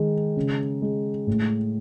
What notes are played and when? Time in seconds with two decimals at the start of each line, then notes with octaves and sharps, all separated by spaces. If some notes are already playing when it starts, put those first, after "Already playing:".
Already playing: D#3 G#3
0.37 C#3
0.82 G#3
1.27 A2